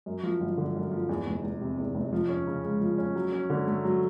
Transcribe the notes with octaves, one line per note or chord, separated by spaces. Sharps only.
F#2
F3
G1
D3
F#2
F3
E2
F1
F1
C3
E2
F1
F3
C#4
C#3
G#3
F3
C#4
F#3
C#4
D3
A3
F#3